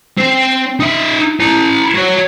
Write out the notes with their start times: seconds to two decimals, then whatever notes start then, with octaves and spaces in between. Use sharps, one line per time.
0.18 C4
0.80 D#4 E5
1.40 E4 A#5
1.95 F#4 C#5